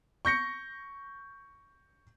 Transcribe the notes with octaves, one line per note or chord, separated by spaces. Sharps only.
C#6 G6 A#6 C#7